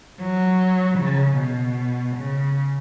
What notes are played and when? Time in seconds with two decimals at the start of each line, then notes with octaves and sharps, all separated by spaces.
0.21 F#3
0.99 C#3
1.38 B2
2.17 C#3